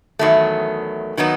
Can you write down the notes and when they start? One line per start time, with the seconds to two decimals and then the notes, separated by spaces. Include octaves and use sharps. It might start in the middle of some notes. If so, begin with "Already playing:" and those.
0.19 E2 D#3 F#3 A3
1.17 D#3 F#3 B3 D#4